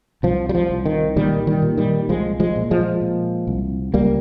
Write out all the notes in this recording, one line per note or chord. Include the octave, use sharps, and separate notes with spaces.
C2 F3
G3
F3
C2
D#3
A#2 D#3 G3
D#3 G3
A#2
D#3 G3
C2 F3 G#3
F3 G#3
A#2
F3 G#3
A#2
C2
C#2 G3 A#3